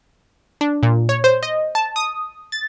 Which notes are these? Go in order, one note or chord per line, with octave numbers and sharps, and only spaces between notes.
D4
A#2
C#5
C5
D#5
A5
D#6
A6